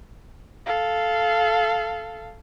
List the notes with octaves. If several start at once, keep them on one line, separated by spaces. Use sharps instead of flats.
A4 F5